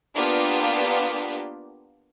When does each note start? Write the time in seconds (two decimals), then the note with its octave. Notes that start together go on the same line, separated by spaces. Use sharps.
0.14 A#3 B3 D4 F4 G4